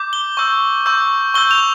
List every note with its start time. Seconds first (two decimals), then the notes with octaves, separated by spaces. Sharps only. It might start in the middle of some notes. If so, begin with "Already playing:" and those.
Already playing: D6 G6
0.13 G7
0.37 C#6 E6 G6
0.86 C#6 E6 G6
1.34 C#6 E6 G6 G7
1.51 F7